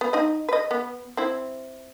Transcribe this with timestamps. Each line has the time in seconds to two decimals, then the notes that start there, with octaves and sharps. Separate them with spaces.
0.01 B3
0.13 D#4 D#5
0.49 B4 D#5
0.71 B3
1.17 C4 E4